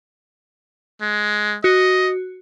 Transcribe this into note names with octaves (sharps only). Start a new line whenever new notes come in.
G#3
F#4 D#5